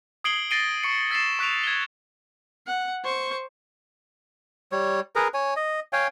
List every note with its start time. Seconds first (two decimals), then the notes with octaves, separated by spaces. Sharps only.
0.24 D#6 G#6 C7 D7 F#7 G7
0.51 A6 A#6 C7 D7 D#7 G7
0.83 C#6 C#7 D#7
1.10 E6 A6 B6 C7 E7
1.39 C#6 F#6 B6 D7 F7
1.64 G#6 G7
2.67 F#5
3.04 C5 C#6
4.72 G3 C#5
5.15 G#4 A#4 B4 A#5
5.34 C#5 G#5
5.56 D#5
5.93 C#5 F5 G5 G#5